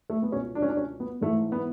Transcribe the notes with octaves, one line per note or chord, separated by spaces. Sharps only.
A3
B3
C#2 B2 C#4
D4
C#4
D4
C#4
B3
G#2 E3 A3
B3